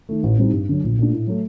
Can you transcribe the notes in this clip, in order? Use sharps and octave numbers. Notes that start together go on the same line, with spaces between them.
D#3 A3
A1
A2 G3 C4 D#4
G2
D3 F#3
A#1
A#2 A3 D4
A2
F#3 A3